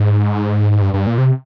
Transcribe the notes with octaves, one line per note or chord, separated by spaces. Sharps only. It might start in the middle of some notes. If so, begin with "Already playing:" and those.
Already playing: G#2
G2
G2
A#2
C3